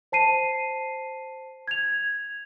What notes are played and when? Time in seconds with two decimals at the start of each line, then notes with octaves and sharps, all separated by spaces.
0.12 C5 A5 C7 D#7
1.68 G#6 F7